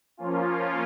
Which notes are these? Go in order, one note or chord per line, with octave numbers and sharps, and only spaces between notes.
F3 A#3 C#4 F4